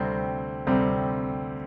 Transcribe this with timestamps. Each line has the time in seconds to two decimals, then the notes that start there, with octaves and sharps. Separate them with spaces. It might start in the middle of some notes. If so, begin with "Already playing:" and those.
Already playing: D2 C3 G3 C4
0.67 D2 C3 G3 C4